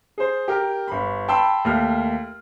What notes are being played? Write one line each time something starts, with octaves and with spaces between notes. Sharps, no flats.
G#4 C5
G4 A#4
G1 B5
G5 A5 B5 C6 E6
D#2 A3 A#3 F6